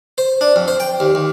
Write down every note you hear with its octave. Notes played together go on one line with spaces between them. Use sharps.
C5
D4
F2
C5
G5
D#2
D#2